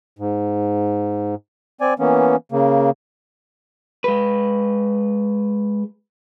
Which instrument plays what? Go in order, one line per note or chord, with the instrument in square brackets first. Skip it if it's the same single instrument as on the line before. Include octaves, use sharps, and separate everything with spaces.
[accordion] G#2
C4 D5 G#5
E3 A#3 B3 C#4
C#3 A#3
[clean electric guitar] G#3 B4